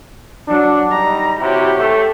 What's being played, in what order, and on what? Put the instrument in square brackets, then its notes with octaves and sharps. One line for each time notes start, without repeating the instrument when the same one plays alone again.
[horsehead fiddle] F#3 F#5 [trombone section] D4
[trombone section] G3 D#4 [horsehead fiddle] A#5
[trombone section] C3 E4 F#4 [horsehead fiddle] G4 C#5
[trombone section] A3